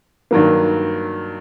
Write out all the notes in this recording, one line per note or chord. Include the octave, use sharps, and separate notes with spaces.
G2 D#3 F#3 A#3